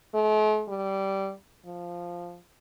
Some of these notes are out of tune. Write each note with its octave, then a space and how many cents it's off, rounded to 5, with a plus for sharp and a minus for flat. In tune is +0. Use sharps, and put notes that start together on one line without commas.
A3 -45
G3 -15
F3 +0